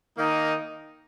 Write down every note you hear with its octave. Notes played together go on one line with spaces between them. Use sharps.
D#3 A#3 D#4